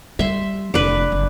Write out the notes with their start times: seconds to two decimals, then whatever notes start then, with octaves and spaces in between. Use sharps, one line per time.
0.19 G3 E5 C6
0.74 F1 D4 E4 B4
1.12 F#1